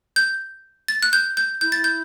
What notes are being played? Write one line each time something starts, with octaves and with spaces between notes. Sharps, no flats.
G6
A6
F#6
G6
G6
E4 G6
A6
G6